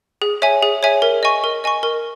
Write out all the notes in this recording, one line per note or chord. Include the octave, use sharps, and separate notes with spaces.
G#4
C#5 E5 G#5
G#4
C#5 E5 G#5
A#4
D#5 G#5 C#6
A#4
D#5 G#5 C#6
A#4